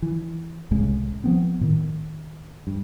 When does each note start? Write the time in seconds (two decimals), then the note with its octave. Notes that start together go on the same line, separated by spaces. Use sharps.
0.02 E3
0.71 C2 A2 C#3 G#3
1.24 F3 B3 C4
1.61 A2 D#3
2.67 G2